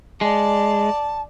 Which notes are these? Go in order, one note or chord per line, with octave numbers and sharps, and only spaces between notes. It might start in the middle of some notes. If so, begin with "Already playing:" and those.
G#3 D5 A5